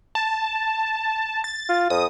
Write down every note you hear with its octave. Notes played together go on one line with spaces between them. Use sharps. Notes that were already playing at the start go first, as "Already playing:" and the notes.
A5
A6
F4
F2 D#6